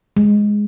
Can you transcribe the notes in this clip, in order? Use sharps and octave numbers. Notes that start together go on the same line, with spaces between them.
G#3